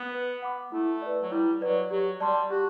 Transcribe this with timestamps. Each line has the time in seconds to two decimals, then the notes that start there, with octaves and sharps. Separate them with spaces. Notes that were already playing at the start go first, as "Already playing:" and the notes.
Already playing: B3
0.12 B4
0.42 F#5 B5 D6
0.72 A3 E4
1.02 B4 D5
1.22 F#3
1.32 G3 E4
1.61 F#3 B4 D5
1.91 F#3 G4
2.20 G3 D5 A5 C6
2.50 F#4 G4